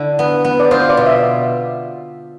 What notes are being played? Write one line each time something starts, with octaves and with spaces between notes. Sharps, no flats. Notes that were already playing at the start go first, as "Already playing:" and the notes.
Already playing: D3 E4
B3
B3
D5
F4 C5
D5
B2
E5